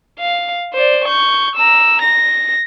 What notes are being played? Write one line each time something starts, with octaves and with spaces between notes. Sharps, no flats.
F5
C5 D5
C#6 G6
A#5 E6
A#6